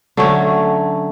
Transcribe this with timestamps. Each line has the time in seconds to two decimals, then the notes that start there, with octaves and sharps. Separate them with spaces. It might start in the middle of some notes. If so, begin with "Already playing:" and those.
0.17 D3 F#3 A3 C#4